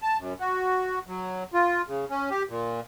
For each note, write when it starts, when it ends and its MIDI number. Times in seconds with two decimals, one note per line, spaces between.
0.02 0.17 81
0.18 0.34 42
0.40 0.99 66
1.08 1.44 54
1.54 1.82 65
1.88 2.05 49
2.10 2.30 61
2.30 2.43 67
2.49 2.80 46